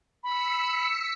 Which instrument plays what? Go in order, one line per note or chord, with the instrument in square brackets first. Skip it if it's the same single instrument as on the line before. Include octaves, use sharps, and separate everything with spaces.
[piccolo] B5 [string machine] E6 B6 C#7